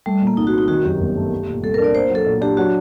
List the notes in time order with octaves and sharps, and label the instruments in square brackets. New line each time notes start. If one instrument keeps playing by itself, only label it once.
[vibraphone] G3 [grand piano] A3
[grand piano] A#2
[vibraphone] A#3
[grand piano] C2 [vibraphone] D#4
[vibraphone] F#4
[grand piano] C4
[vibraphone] D#4
[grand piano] D#3 [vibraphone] F#4
[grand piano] F#2 [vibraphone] G4
[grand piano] G1
A3
A3
A#2
[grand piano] C2 [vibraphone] A4
[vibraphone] A#4
[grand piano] D4
[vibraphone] D5
[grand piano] A#3 [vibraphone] C5
[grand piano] F#3 [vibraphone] A4
[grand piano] A#2
[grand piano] D4 [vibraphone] G4
[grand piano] F#3 [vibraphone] F#4